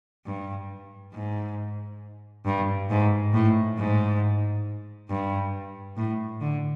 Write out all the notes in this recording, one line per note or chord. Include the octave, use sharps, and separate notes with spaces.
G2
G#2
G2
G#2
A2
G#2
G2
A2
D3